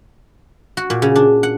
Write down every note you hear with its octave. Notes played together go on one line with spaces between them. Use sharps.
F#4
A#2
C#3
D4
F#5